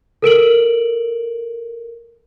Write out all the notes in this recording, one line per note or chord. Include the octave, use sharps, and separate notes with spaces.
A4 A#4 D7 F#7